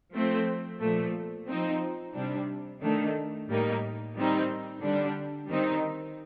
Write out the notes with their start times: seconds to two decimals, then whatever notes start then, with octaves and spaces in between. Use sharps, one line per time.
0.13 F3 A3 C4
0.81 A#2 F3 A3
1.48 F3 C4 D#4
2.14 C3 G3 D4
2.81 D#3 A3 D4
3.48 A2 G3 A#3 D#4
4.15 D#3 G3 C4 D#4
4.83 D3 G3 D4
5.50 D#3 G3 C4 D#4